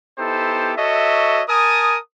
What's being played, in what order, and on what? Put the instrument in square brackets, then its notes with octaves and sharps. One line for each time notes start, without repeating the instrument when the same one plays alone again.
[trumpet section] B3 D#4 E4 G4 A4 C5
F#4 A4 C#5 D#5 E5
A#4 G#5 A5 D#6